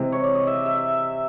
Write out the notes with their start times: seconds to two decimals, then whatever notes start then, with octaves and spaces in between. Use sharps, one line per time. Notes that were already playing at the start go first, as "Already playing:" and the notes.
Already playing: C3 E3 G#3 C4
0.12 C#5
0.24 D5
0.35 D#5
0.47 E5
0.66 E5